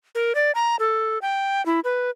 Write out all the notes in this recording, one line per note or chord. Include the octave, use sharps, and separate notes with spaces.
A#4
D5
A#5
A4
G5
E4
B4